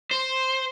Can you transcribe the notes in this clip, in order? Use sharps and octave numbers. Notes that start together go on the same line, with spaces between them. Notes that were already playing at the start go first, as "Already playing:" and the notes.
C5